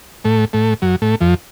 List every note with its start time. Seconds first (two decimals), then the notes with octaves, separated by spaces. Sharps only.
0.24 A2 A3
0.53 A2 A3
0.82 F#2 F#3
1.02 A2 A3
1.21 F2 F3